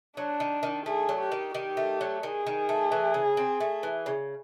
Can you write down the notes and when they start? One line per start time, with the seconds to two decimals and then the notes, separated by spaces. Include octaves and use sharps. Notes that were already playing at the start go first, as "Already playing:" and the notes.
0.17 F#3 D4
0.40 D#3
0.63 D#3
0.86 A3 G#4
1.09 F#3
1.20 G4
1.32 D#3
1.55 D#3 G4
1.77 A3
2.01 F#3
2.23 D#3 G#4
2.46 D#3
2.69 A3
2.92 E3
3.14 C#3
3.37 C4
3.60 A3
3.83 E3
4.06 C#3